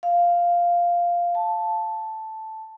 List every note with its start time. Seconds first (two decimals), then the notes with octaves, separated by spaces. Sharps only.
0.03 F5
1.35 A5